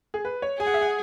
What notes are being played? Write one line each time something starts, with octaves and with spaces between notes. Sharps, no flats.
G#4
B4
C#5
G#4 G#5
F#5
E5
F#5